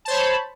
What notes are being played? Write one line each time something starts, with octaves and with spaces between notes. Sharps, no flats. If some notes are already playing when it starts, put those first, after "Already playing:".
C5 C#5 A5 B5